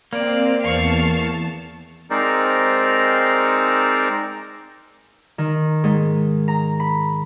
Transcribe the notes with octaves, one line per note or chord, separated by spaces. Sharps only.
A#3 C4 D5
E2 F5 A5 C#6
G#3 C4 D#4 A#4 C5 D5
D#3
G#2
A#5
B5